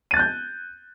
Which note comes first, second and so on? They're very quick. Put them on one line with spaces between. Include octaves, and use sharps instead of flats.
D#7 A6 F#6 G6